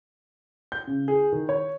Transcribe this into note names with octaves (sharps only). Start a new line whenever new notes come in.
G6
C#3
G#4
D#3
C#5